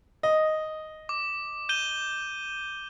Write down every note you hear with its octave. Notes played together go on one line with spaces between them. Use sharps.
D#5
D6
G6 D#7 G7